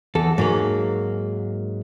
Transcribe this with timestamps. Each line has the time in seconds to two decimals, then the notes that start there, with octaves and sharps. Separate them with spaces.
0.15 E2 A4
0.38 G#2 F#3 A#3